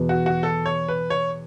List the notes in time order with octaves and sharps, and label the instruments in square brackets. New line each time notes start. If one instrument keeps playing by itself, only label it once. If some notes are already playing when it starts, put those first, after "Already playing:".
Already playing: [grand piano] E2 B2 B3
[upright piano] F#4
F#4
A4
C#5
B4
C#5